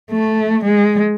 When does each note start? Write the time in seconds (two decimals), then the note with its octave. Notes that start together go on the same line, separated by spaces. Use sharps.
0.11 A3
0.64 G#3